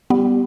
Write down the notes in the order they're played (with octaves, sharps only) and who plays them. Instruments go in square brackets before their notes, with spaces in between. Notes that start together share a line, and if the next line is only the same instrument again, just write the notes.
[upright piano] G3 [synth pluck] B3